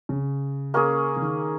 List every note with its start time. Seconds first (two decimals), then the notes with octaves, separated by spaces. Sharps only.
0.09 C#3
0.74 A#3 C#4 G#4
1.16 C#3
1.22 D#3